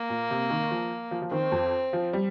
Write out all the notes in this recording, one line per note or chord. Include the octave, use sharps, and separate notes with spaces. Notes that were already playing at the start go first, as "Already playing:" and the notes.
Already playing: A#3
A#2
C3
D#3
F3
F3
F3
D#3 C4
F2
F3
G3